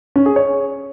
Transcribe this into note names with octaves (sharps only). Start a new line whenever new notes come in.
C#4
G#4
C#5